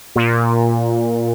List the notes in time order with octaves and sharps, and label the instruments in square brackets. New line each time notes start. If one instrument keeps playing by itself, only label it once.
[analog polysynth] A#2